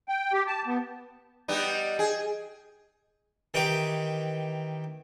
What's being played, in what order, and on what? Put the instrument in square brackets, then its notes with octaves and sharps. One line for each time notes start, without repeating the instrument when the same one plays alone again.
[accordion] G5
G4
A5
B3
[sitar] G3 B3 D#4
G#4
[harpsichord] D#3 E3 G4 D#5 D6